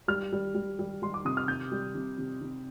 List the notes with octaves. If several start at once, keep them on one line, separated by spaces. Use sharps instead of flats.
G3 F6
G3
G3
G3
G3 C6
D6
C3 D#6
F6
C3 G6
G3
C3
C3
C3